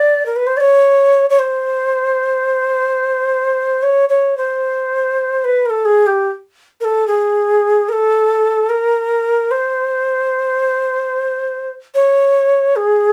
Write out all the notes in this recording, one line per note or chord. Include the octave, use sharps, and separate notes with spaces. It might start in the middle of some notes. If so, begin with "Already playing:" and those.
Already playing: D5
A#4
B4
C5
D5
C#5
C#5
C5
C#5
C#5
C5
B4
A#4
A4
G#4
G4
A#4
A4
G#4
A#4
A4
A#4
C5
C#5
G#4